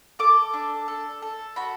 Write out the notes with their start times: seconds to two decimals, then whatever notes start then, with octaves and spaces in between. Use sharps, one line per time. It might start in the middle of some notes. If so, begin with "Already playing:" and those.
0.19 A4 D6
0.54 D4
0.88 A4
1.22 A4
1.56 F#4 B5